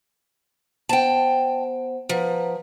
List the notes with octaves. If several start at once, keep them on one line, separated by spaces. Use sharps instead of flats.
B3 C5 F#5 G5 A5
F3 B4 F#5 A#5